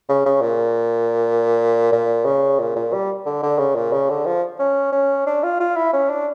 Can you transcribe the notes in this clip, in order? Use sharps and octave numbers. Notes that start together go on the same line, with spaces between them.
C#3
C#3
A#2
A#2
C#3
A#2
A#2
G3
D3
D3
C#3
A#2
C#3
D3
F3
C#4
C#4
D4
F4
F4
E4
C#4
D4